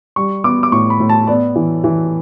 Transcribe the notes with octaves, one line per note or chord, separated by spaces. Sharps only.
G3 C#6
B3 D6
D6
A2 C#6
B5
A2
A5
B3 D5
E3
E3